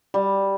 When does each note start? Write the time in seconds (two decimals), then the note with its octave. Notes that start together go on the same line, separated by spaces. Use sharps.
0.14 G3